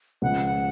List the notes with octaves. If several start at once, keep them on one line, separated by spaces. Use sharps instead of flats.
C#2 C#3 F3 F#5
F#5